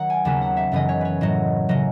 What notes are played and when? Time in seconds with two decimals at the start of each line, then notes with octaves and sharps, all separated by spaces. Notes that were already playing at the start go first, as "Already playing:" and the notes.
Already playing: D#3 F#3 F#5
0.10 G#5
0.25 D#2 C#3 F#3 B3 A5
0.42 F#5
0.57 E5
0.72 F#2 C#3 E3 B3 D#5
0.89 C#5
1.01 B4 C#5
1.21 A2 F#3 A3 D#5
1.69 C#3 F#3 D#5